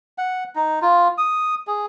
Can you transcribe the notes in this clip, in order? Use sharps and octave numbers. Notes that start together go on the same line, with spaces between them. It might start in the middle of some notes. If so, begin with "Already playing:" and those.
F#5
D#4
F4
D#6
G#4